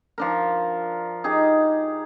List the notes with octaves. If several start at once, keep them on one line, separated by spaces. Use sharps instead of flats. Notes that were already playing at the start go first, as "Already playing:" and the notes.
F3 D4 A#4
D#4 G4 G#4